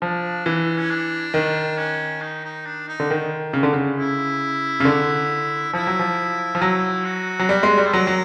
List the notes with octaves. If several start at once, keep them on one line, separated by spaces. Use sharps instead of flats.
F3 D4
E3
C#4
D4
D#3
C#4
D#4
D#4
D4
D#4
D3
D#3
C#3
D3
C#3
E4
C#3
D3
F3 E4
F#3
F3
F3
F#3
F#4
F#3
G3
G#3
G3
A4
F#3 A#4
F#3